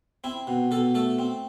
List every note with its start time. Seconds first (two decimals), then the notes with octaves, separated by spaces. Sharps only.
0.24 C4 E4
0.47 B2
0.71 B2 A4
0.95 A3 A4
1.19 C4